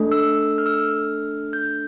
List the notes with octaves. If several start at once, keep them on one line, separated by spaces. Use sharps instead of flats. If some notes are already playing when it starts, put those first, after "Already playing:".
Already playing: A3 D4 A4
E6
F6
E6
F6
G6